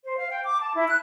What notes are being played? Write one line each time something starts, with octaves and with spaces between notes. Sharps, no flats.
C5
F5
G5
D6
A5
E4
F#6